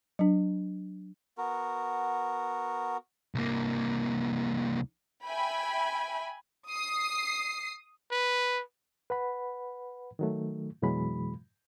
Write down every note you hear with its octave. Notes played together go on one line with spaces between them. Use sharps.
F#3 D4
B3 F#4 A#4
C2 A#3
E5 G5 G#5 B5
D#6 C7
B4
B4 F#5 B5
D#3 F#3 A3
F2 B2 E3 F#3 G#3 B5